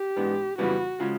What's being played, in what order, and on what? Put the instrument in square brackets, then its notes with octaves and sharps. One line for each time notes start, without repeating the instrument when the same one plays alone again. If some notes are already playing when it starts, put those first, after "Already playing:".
Already playing: [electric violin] G4
[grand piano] G#2 E3 G#3 B3 D4
[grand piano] F2 C#3 E3 G3 B3 [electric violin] F#4
[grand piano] C#3 F3 G#3